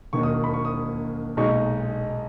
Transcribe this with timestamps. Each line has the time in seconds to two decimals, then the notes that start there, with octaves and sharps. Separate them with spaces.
0.13 E1 D#2 D#3 A#3 C#6
0.23 D#6
0.34 C#6
0.44 B5
0.54 C#6
0.65 D#6
1.37 B1 A#2 G#3 D#4 C#6